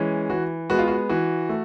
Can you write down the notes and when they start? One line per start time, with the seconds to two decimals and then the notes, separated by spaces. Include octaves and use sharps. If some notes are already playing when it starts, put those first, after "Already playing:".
Already playing: E3 G#3 C#4
0.30 E3 F#4
0.70 G#3 B3 F#4
0.78 F4
0.88 F#4
1.09 E3 F#4
1.49 A3